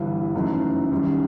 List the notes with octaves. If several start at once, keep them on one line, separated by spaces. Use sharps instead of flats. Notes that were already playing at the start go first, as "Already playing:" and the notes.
Already playing: G1 G2 E3
F#1 F#2 E3 A3 D#4
F#2 D#3 G3